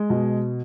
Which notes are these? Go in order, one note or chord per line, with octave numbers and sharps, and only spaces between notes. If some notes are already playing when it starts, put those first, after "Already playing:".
Already playing: G#3
B2